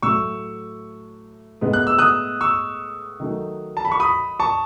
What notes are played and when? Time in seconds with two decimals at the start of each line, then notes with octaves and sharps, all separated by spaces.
0.02 A2 F#3 A3 C#6 E6
1.61 A2 G#3 B3
1.73 F#6
1.87 E6
1.98 D#6 F#6
2.41 C#6 E6
3.20 D#3 F#3 A3
3.77 A5
3.85 B5
3.92 C#6
4.00 B5 D#6
4.40 A5 C#6